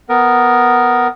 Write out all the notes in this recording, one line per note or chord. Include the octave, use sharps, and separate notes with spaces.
B3 A#4